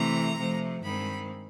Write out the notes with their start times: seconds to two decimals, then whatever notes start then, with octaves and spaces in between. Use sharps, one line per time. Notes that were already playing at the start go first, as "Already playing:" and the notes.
Already playing: C3 E3 A3 C4 A#5
0.36 C3 F3 A3
0.82 G2 D#3 G#3 C4 B5